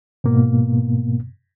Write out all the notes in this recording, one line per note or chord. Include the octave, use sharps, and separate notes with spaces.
G#2 B2 A#3 B3